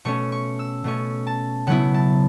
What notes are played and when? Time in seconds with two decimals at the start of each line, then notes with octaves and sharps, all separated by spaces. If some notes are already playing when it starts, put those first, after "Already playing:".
0.05 B2 A3 C#4 C#6
0.32 C#6
0.59 E6
0.84 B2 A3 C#4 C#6
1.27 A5
1.67 C#3 F#3 B3 E4 F#5
1.94 A5